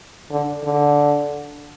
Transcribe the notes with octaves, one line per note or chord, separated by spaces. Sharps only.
D3
D3